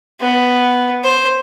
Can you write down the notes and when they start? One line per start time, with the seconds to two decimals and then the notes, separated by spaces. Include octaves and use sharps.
0.20 B3
1.04 C5